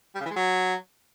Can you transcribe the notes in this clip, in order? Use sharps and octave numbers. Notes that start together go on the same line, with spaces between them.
G3
C#3
E3
G#3
F#3